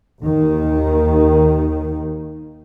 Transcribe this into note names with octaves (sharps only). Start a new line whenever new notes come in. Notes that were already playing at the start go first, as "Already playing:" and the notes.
D#2 D#3